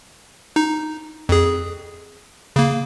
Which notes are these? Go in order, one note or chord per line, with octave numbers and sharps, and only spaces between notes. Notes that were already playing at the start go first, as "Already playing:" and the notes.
D#4
F2 G#4
C#3 A#3